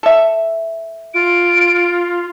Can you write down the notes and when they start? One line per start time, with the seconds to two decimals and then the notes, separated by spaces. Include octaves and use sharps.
0.03 A4 E5
1.14 F4 D7